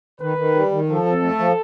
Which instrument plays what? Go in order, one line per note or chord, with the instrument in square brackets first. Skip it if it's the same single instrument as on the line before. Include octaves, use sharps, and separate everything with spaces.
[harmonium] D#3 [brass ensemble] B4
[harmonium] D#3
G3
D#3
[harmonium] F3 [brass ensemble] A4
[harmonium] F2
A3
F3